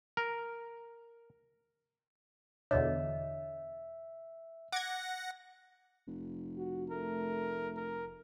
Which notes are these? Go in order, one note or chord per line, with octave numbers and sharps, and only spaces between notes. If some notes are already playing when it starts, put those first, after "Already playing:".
A#4
E2 B2 D3 C#5 D#5 E5
F#5 D6 G#6 A#6
F1
F#4
A3 A#4
A#4